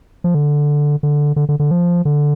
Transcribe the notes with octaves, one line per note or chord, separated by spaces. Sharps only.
F3
D3
D3
D3
D3
D3
F3
D3